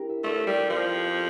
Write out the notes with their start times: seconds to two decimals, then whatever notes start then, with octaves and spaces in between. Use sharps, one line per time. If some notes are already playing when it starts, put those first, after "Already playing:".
Already playing: D4 E4 G4 A#4
0.09 E5
0.24 A3 D5
0.36 C5
0.47 G3 A#4
0.59 A4
0.70 F3 G4